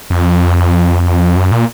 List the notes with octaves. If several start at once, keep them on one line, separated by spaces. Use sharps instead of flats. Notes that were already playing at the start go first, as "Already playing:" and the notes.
F2
F#2
A#2